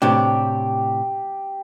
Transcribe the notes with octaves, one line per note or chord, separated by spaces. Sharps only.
A2 C3 D4 G4